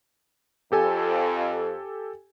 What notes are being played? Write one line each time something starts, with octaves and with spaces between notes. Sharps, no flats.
F2 G4 A4 G#5